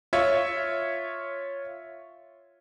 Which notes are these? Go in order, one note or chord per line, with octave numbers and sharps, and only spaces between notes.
F4 C#5 E5